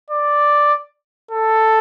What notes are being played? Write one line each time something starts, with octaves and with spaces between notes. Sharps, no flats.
D5
A4